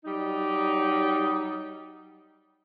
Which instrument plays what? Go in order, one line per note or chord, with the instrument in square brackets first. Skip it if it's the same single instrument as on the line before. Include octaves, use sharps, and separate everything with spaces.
[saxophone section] F#3 G3 D#4